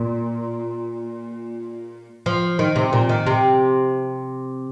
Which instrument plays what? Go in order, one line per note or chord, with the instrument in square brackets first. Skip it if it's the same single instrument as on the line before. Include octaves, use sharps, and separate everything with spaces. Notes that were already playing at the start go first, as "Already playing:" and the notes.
Already playing: [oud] A#2
F3
D#3
C3
A#2
D#3
C3